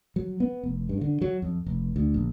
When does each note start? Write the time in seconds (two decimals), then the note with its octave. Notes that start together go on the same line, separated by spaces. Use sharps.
0.16 F#3
0.40 B3
0.63 F1
0.89 G2
1.01 D3
1.21 F#3
1.42 F2
1.66 F1
1.96 D2
2.14 A#1